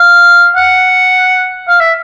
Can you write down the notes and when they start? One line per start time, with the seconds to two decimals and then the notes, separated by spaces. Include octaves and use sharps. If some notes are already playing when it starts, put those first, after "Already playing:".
Already playing: F5
0.56 F#5
1.69 F5
1.81 E5